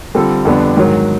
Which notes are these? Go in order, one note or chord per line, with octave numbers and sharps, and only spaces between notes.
D3 G3 C4 F4 A4
F2 D3 G3 B3 D4
G#2 D#3 F#3